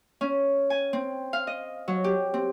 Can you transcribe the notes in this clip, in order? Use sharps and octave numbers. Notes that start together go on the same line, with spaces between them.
C#4
G#5
C4
F5
D#5
F#3
G4
C4